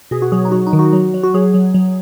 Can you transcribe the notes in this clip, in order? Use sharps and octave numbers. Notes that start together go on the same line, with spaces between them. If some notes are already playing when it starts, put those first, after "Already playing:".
B2 G#4
F#4
F#3 G#4
D#4
F#3 F#4
D#4
D#3
F#4
F#3
F#3
F#4
F#3 G#4
F#3
F#3